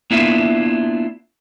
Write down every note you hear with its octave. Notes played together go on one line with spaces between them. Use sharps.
A#3 B3 D4 E4 F4 E5